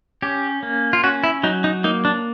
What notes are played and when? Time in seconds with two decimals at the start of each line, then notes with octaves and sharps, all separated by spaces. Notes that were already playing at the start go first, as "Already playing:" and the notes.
0.22 C#4 G4
0.63 A#3
0.93 F4
1.03 C#4 F#4
1.24 E4
1.43 F#3 D#4
1.64 D#4
1.84 A#3 D#4
2.05 D4